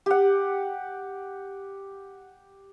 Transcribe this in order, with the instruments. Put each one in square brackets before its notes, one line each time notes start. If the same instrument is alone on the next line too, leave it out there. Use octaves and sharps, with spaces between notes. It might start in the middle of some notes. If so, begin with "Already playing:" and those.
[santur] G4 F#5